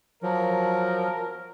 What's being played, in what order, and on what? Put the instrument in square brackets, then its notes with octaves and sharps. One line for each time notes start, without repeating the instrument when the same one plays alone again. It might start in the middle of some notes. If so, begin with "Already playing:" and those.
[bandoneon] F3 F#3 [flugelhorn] A#4